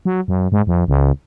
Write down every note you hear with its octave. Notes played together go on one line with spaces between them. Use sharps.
F#3
F#2
G#2
F2
C#2